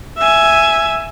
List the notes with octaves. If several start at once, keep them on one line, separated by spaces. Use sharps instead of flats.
E5 G#5